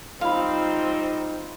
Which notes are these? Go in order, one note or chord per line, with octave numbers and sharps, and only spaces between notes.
G3 C4 D#4 F4 F5 B5